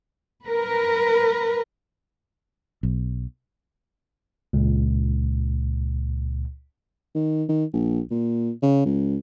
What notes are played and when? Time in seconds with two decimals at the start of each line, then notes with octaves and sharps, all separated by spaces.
0.45 A#4 B4
2.83 B1
4.53 C#2 A#2
7.15 D#3
7.49 D#3
7.73 A#1
8.11 A#2
8.62 C#3
8.85 C#2